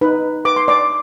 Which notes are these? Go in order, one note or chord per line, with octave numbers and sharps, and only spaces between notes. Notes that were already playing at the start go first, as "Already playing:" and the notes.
D#4 B4 B5
B4 D6
C6
D5 D6